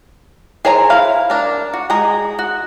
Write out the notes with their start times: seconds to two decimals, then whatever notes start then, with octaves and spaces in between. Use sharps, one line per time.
0.65 G#4 C5 C#5 G#5 A#5
0.90 E4 F5
1.30 D4 A#4
1.74 F#4
1.90 G#3 G#4 D#5 A#5
2.39 F#4